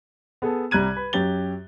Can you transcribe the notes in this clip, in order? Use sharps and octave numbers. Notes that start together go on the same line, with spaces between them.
B3 G#4 A4
C2 G3 A#5 F#6 G#6 D#7
B4 B5
F#2 F#3 G4 A6 G7